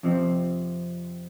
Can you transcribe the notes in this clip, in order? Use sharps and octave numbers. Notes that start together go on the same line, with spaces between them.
F2 C3 F3 C4